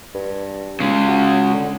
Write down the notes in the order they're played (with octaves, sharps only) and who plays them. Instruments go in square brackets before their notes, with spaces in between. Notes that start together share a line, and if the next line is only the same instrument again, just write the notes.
[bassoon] G2
[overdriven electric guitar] C#3 G#3
[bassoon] F#4
D3